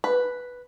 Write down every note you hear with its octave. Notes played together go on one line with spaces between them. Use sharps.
B4